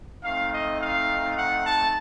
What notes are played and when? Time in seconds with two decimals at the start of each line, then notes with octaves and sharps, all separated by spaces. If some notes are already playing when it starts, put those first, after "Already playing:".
0.23 A3 C4 D#4 F5
0.52 D#5
0.79 F5
1.35 F#5
1.63 A5